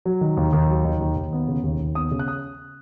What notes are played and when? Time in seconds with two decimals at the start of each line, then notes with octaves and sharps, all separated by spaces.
0.05 F#3
0.21 D#3
0.37 D#2
0.53 D#2
0.69 F#3
0.85 D#3
1.00 D#2
1.16 D#2
1.33 B3
1.48 C#3
1.63 D#2
1.80 D#2
1.95 B3 D#6
2.11 C#3
2.19 F#6
2.28 D#6